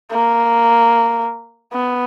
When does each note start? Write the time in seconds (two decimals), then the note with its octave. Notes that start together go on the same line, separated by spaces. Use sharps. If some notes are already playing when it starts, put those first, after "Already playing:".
0.11 A#3
1.73 B3